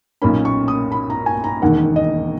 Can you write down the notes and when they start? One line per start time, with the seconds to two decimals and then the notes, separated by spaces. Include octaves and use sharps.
0.22 B1 A#2 A#3 C#4 B5
0.45 C#6
0.68 D#6
0.92 B5
1.10 A#5
1.26 G#5
1.44 A#5
1.62 E1 D#2 D#3 A#3 F#5
1.96 D#5